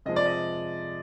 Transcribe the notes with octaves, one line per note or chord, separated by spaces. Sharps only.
C3 F3 G#3 D#5
D5
D#5